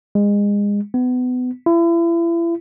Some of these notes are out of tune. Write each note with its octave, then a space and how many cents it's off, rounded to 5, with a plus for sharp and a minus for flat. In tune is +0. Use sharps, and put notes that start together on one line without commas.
G#3 -25
B3 +25
E4 +35